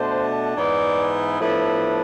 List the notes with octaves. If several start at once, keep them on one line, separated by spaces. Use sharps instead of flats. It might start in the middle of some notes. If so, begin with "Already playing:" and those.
Already playing: B2 A3 D4 C5
G#2 E3 B3 E4 D5
A2 F3 B3 D4 E5